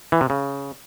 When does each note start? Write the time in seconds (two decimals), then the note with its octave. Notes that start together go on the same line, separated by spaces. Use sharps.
0.12 E3
0.21 C3
0.30 C#3